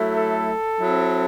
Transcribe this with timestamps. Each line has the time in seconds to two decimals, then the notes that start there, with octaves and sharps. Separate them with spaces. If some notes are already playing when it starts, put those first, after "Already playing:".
Already playing: F#3 A3 E4
0.15 A4
0.79 F#3 C4 E4